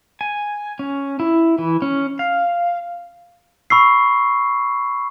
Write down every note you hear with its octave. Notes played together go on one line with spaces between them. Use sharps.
G#5
C#4
E4
E3
C#4
F5
B5 C#6 E6 C7